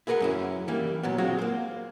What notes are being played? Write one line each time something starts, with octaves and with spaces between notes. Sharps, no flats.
E4 G#4 A#4 B4 F#5
F#2 C#4 E4
E3 G3 A#3
A#2 F#3 B3
F#3 G#3 C4 F4 F#4
A#3 C5